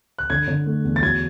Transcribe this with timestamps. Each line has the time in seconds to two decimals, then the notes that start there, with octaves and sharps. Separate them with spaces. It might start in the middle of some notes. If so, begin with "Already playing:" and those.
0.18 F#6
0.30 D3 G#6
0.48 D3
0.66 A3
0.84 E2
0.96 A6
1.02 F#3 G#6